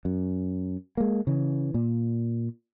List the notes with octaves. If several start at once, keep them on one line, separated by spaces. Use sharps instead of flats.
F#2
G#3 A#3
C#3 E3
A#2